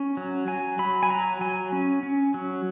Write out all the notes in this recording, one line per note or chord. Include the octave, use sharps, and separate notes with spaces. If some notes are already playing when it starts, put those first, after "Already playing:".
Already playing: C#4
F#3
F#3 G#5
F#3 B5
G#5
F#3 A#5
F#3 G#5
C#4
C#4
F#3